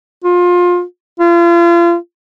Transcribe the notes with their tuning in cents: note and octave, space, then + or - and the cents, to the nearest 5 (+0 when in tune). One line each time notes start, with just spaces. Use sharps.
F4 +25
F4 -35